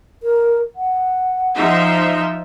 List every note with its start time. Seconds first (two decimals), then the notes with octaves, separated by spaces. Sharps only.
0.23 A#4
0.76 F#5
1.56 F3 D#4 E5